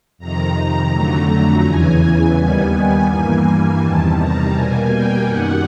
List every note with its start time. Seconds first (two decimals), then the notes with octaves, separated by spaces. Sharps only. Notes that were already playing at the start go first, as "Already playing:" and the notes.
0.18 F2 C3 D#3 A#5
0.91 F2 D3 F#3 A3
1.63 E2 C#3 E3 G#5
2.35 D#2 D#3 G3 B3
3.07 G2 E3 G3 A#3
3.79 E2 C3 D#3 G3 A5
4.16 A#5
4.52 B2 G3 A#3 G#5
4.88 G5
5.24 F#2 D#3 G3 F#5